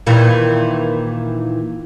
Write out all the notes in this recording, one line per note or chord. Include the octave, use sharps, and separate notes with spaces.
A#2 D#3 E3